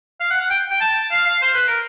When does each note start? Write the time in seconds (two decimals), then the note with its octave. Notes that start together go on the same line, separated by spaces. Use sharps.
0.20 F5
0.30 F#5
0.40 F#5
0.50 G5
0.71 G5
0.81 A5
1.11 F5
1.26 F5
1.42 C5
1.54 B4
1.68 A#4